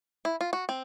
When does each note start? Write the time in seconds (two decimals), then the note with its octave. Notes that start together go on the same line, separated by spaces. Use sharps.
0.25 E4
0.41 F4
0.53 F#4
0.69 C4